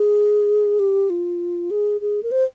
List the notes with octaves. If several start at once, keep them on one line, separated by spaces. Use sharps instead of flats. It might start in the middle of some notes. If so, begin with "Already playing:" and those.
Already playing: G#4
G4
F4
G#4
G#4
A#4
C5